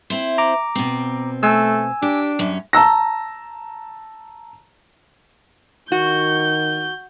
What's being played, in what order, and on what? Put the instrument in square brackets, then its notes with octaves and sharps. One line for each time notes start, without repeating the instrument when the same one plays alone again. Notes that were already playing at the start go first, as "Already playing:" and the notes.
[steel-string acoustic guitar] C4 E4 C5
[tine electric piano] A#5 D6
[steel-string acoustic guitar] B2 C4
[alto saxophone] A3 [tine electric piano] G#5 E6
[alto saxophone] D4 [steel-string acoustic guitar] G4
[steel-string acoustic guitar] F#2 C#4
[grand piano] A5 A#5 E6 A#6
[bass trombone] D#3 [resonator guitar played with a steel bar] F#4 [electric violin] G6